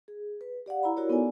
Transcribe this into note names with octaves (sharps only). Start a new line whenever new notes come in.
G#4
B4
G4 D5 F5 F#5
E4 A#5 B5
E4 F#4 G4 A#4 C#5 D5
B3 D#4 F#4 A4 D5 G#5